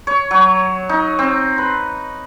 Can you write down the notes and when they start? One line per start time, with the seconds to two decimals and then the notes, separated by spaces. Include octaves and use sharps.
0.07 C#5
0.31 F#3
0.89 D#4
1.19 C4
1.58 B4